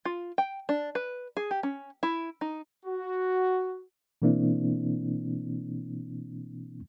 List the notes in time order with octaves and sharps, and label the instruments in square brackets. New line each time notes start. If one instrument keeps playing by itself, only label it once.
[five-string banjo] F4
G5
D4
B4
G#4
G4
C#4
E4
D#4
[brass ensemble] F#4
[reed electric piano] B2 E3 A#3 C4 D4 E4